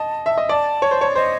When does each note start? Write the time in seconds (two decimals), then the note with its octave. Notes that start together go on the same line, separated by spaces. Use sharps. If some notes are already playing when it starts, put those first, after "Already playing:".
Already playing: D#5 A5
0.26 E5
0.38 D#5
0.49 D5 A5
0.82 C#5
0.91 C5
1.01 C#5
1.11 D5
1.15 C5 D#5